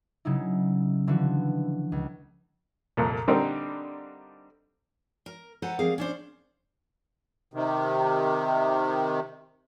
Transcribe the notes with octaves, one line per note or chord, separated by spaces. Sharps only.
C#3 F#3 D#4 E4
D3 E3 F3 B3 F#4
C#2
C2 F2 A#2
D3 G3 A#3 C4 D4 D#4
A#4
A4 B4 C5 F#5 G#5 A#5
F3 G3 C4 G#4 A#4 F5
C#4 D4 C5
C3 D#3